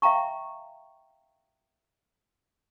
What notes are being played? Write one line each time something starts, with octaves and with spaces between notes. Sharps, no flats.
E5 F5 G5 A#5 C#6